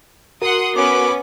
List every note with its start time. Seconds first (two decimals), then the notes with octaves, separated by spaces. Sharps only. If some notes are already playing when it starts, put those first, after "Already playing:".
0.42 F#4 A#4 F#5 C6 D#6
0.76 B3 C#4 B4 D6